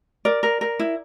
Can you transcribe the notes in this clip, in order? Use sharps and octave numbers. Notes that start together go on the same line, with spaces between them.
A#4 D5
A#4
A#4
E4